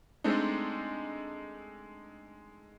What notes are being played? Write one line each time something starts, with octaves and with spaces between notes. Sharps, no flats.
G#3 A3 C4 D4 D#4